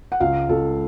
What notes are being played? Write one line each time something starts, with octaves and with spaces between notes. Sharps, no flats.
F#5
C#2 F5
C#2 A4